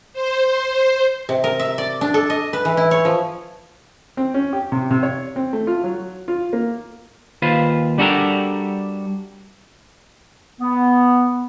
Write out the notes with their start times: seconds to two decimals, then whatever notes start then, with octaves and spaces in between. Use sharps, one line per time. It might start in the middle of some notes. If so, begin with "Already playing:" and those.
0.13 C5
1.29 C3
1.44 A#4
1.60 E5
1.78 D5
2.01 D4
2.14 A4
2.30 D#5
2.53 B4
2.65 E3
2.77 E4
2.91 C#5
3.05 F3
4.17 C4
4.34 C#4
4.53 G4
4.72 C3
4.91 C3
5.03 C#5
5.36 C4
5.53 A3
5.67 F4
5.84 F#3
6.28 F4
6.53 A#3
7.42 D#2 F4 B4 C5
7.98 G3 D4 F#4 G4 A4 A#4
10.60 B3